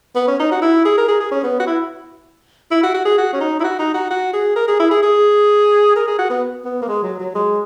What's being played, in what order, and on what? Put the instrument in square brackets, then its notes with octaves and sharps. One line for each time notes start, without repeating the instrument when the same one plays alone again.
[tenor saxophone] B3
C#4
D#4
F#4
E4
G#4
A#4
G#4
G#4
C#4
B3
F#4
E4
E4
F#4
F#4
G#4
F#4
C#4
D#4
E4
F#4
D#4
F#4
F#4
G#4
A#4
G#4
E4
G#4
G#4
A#4
G#4
F#4
B3
B3
A#3
G#3
F#3
F#3
G#3